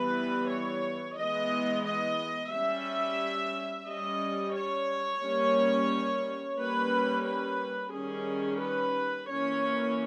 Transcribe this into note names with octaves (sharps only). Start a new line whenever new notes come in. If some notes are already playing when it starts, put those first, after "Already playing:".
Already playing: E3 G3 B3 B4
C#5
E3 G#3 B3 D#5
D#5
G3 C#4 E5
G3 C#4 D#5
C#5
G3 A#3 C#4
G3 A#3 C#4 B4
B4
D#3 G3 C#4 G#4
B4
E3 A#3 C#4 C#5